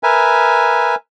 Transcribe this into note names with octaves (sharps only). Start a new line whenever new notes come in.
A#4 B4 E5 G#5